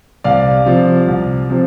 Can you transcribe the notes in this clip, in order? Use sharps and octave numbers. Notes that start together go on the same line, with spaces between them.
C2 D5 F5
C3 F3
C2
C3 F3